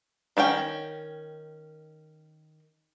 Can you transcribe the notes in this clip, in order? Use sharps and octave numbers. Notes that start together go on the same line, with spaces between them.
D#3 C#4 F4 G5